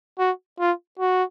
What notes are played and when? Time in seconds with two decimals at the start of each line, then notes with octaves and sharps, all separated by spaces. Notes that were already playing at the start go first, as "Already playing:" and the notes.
0.19 F#4
0.60 F4
0.99 F#4